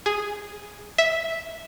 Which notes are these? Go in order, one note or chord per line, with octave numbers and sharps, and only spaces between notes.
G#4
E5